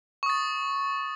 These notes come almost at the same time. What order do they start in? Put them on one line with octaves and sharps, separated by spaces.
C#6 D#6 A6